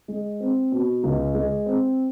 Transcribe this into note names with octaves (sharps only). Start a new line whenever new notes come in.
G#3
C4
B2
C#2
G#3
C4